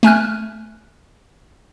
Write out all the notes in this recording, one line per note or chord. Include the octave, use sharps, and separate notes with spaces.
A3 G#5 F6 F#6